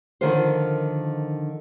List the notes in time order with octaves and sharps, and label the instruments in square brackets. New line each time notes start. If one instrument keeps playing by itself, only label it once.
[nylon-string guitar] D3 D#3 F3 F4 A#4 C5